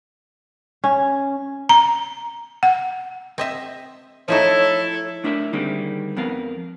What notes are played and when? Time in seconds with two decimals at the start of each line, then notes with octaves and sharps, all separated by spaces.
0.84 C#4
1.69 A#5
2.63 F#5
3.38 C4 D#5 E5
4.28 F3 A3 D#4 E4 A4 C#5
5.24 A3 D4 E4 A#4 D#5 E5
5.53 D3 D#3 G3 G#3 A#3 C4
6.17 F2 B3 A#4 F5